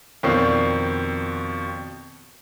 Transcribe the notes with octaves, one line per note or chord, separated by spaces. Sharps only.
F2 B2 D#3 C4 D5 C7